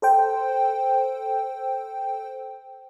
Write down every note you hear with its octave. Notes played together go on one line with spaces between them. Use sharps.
A4 C5 G5